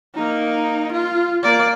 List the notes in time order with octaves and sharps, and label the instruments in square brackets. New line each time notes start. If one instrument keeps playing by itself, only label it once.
[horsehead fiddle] A#3 D#4
F4
A#3 D5